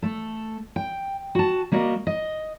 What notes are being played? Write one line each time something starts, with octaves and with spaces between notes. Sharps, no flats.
A3 A4
G5
F#4 A5
G3 A#3 F#4 D#5
D#5